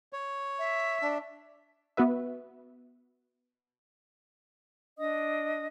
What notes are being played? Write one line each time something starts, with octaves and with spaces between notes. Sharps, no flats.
C#5
E5
D4
B3 F#4 B4 E5
D4 D#5 D#6